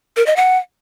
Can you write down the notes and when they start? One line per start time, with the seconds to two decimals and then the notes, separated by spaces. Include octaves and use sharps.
0.17 A#4
0.26 D#5
0.36 F#5